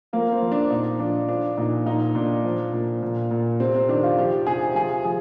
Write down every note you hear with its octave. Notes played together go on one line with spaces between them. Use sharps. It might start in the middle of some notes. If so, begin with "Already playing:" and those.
F3 A#3
C4
F3
D4
A#2 D#4
F3 D4
F3 D4
A#2 D#4
A#2 D#4
A#2 D4
F3
A#2
A#2
A#2
C3 C4
C4
D#3 D4
F4
F3 G4
C3 G#4
F3 G#4
F3 G#4